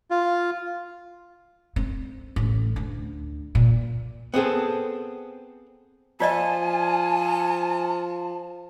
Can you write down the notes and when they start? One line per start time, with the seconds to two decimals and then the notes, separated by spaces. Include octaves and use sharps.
0.11 F4
1.76 C4
2.36 A1 C#3
2.76 D2
3.55 A#2
4.34 B3 C4 G#4 A4
6.20 F3 F4 D5 D#5 G#5 A5